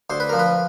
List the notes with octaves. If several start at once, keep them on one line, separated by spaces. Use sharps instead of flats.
D2 C5
B4
F3 A#4
B4